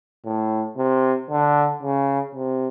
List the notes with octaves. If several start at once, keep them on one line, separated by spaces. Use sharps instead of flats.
A2
C3
D3
C#3
C3